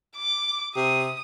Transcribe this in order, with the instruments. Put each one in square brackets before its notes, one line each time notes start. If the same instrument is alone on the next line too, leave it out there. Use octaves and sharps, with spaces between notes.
[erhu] D6
[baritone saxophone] C3 [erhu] D#6